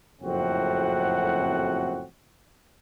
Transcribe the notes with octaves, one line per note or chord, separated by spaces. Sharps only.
F#1 F2 A2 C4 F#4 F#5